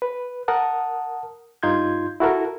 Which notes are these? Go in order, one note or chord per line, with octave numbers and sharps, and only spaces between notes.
B4
A#4 F#5 A5 D#6
G2 D#4 F4 C6 G6 G#6
E4 F#4 A4 A#4